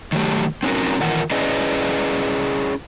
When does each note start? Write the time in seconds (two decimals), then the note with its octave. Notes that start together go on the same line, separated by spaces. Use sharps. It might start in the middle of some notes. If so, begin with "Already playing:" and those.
0.12 D#3 F#3 A3 G4
0.63 C4 C#4 D#4 F#4 A#4
1.00 D#3 E3 F4 A#4 F#5
1.31 C#4 E4 G#4 B4 D5 D#5